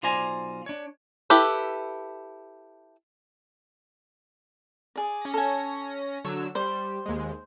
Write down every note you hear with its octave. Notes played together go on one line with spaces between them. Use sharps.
B1 F4 C5 D5 G#5 A#5
D4 C#5
E4 G4 A4 B4
G#4 D5
C#4 A#6
A4 G#5
D3 F#3 C#5 E6
G3 C5
D#2 G#3